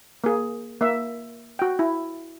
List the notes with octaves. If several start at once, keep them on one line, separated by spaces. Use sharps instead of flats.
A#3 G#4
A#3 E5
F#4 G5
E4